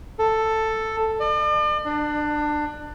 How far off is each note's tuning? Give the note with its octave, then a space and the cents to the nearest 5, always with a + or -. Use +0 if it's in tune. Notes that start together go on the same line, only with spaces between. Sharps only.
A4 +5
D5 +40
D4 +20